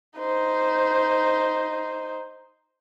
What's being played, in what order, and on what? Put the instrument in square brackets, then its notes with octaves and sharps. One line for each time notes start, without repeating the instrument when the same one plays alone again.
[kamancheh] D#4 C5